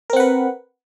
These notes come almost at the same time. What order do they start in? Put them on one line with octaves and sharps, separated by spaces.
A#4 C4 F#5 B4